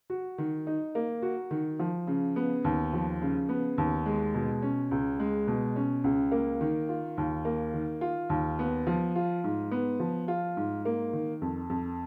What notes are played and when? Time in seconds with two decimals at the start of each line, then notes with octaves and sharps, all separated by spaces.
0.10 F#4
0.38 D#3
0.67 D#4
0.95 A#3
1.22 F#4
1.51 D#3
1.79 F3
2.07 C#3
2.36 B3
2.64 D#2
2.93 F3
3.22 C#3
3.49 B3
3.78 D#2
4.06 G#3
4.34 B2
4.62 C#4
4.91 C#2
5.20 G#3
5.48 B2
5.76 C#4
6.04 C#2
6.32 A#3
6.61 D#3
6.89 F4
7.18 D#2
7.45 A#3
7.74 D#3
8.01 F4
8.30 D#2
8.59 B3
8.87 F3
9.16 F4
9.44 G#2
9.71 B3
10.00 F3
10.28 F4
10.57 G#2
10.85 A#3
11.13 D#3
11.42 F2
11.70 F2